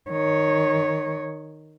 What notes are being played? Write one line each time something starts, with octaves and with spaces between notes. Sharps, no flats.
D#3 C#5